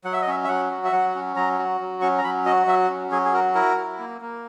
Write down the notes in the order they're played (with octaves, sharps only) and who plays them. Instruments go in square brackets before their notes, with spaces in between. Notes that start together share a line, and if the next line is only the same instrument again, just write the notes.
[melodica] F#3 F#5
E5
D#5
C#4 E5
E5
F#3 F#5
F#4
E5
F#3 F#5
C#4
F#3 A#5
F#4
F#3
C#4 C#6
A#5
F#3 B5
F#4 D#5
F#3 E5
C#4
F#3 G#4
G#4
F#4 A#4
E4 A#4
E4
A#3
A#3